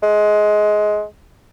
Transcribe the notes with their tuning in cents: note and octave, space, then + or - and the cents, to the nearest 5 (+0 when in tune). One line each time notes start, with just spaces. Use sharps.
G#3 +20